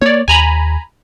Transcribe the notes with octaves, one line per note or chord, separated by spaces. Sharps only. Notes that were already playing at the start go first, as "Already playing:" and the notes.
A#3 C#5 D5
D#2 G#5 A#5 B5